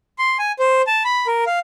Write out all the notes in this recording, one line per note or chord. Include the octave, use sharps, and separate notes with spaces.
C6
G#5
C5
A5
B5
A#4
F5